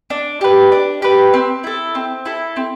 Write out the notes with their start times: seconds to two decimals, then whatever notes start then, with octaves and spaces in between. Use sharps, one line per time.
0.10 D4
0.41 G4 B4
0.72 D4
1.02 G4 B4
1.34 C4
1.64 E4 A4
1.95 C4
2.26 E4 A4
2.56 C4